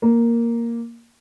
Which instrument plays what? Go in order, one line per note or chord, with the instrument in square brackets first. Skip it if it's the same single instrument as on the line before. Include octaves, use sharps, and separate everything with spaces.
[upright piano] A#3